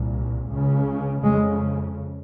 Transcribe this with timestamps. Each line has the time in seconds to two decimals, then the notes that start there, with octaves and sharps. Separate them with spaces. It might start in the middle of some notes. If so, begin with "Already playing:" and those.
Already playing: C2 A#2
0.50 C#2 C#3
1.23 F2 C#3 G#3